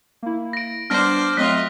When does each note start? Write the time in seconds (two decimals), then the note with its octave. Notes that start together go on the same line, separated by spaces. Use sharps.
0.23 A#3 E4
0.53 A#6 D7
0.90 G3 B3 D4 C5 D5 F6 A#6 D7
1.37 F#3 A3 C4 F4 D#5 F6 F#6 B6